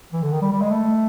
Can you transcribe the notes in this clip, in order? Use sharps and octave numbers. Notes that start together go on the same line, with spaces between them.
E3
D3
D#3
G3
G3
G#3
A3